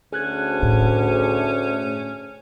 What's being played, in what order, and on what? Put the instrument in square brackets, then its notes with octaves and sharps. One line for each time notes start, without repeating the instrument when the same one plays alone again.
[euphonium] D2 [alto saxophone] C#4 [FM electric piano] G#4 F#6 G#6
[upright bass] A2